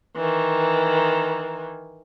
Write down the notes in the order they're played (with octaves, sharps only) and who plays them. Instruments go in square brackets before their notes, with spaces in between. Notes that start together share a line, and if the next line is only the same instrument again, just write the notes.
[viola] D#3 E3